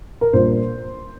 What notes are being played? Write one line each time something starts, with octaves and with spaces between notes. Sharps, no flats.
A#4
A#1 A#2 G3 C5